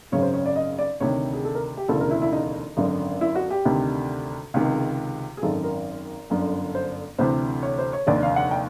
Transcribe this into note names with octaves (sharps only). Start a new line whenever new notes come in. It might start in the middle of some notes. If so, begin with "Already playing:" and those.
G#1 F#2 C#3 C#5
C5
C#5
D5
D#5
D5
D2 C3 D#3 C#5
G#4
A4
A#4
G4
E1 D2 C#3 E3 A4
A#4
E4
E4
D#4
G#1 F#2 D3
E4
F#4
G4
D2 C3 D#3
C#2 C3 D#3 G#4
G#4
G#1 F#2 D#3 A4
A#4
G1 F#2 D3
C5
D2 C3 E3 C5
C#5
C5
C#5
F1 D#2 D3 D5
F5
F#5
G5